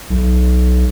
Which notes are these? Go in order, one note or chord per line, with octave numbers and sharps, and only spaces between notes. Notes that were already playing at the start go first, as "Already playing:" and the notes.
B1